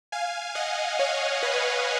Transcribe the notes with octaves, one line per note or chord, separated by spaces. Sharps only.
F5 G#5
D#5 F#5
C#5 F5
B4 D#5